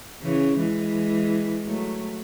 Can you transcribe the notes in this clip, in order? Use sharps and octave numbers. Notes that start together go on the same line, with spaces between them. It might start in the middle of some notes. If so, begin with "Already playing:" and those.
C#3 E3
E3 G#3
F#3 A3